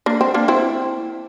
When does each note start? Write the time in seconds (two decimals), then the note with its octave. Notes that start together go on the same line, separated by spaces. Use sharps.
0.06 A#3 D4
0.21 C4
0.34 A#3 D4
0.48 C4 E4